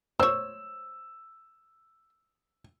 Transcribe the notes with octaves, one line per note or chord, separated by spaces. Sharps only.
C5 C#5 E6